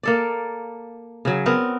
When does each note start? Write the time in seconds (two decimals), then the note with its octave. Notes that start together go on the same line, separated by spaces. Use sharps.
0.03 A#3 A4 D5
1.25 C#3 F#3
1.46 B3 C4 A#4